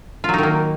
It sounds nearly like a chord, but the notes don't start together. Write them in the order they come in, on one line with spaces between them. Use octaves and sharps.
F4 F#3 D#4 D#3 A#3